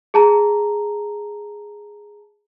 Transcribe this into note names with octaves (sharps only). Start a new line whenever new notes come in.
G#4 A5 A#5